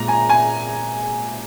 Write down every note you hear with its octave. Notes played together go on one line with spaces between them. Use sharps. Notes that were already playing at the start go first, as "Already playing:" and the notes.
Already playing: A#2 G#3 A#5
G#5
G#5